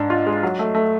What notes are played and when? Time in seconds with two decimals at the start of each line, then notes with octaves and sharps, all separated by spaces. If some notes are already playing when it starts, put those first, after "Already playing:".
Already playing: G#2 D4
0.10 F4
0.26 G#3
0.43 F#3
0.59 A3
0.75 A3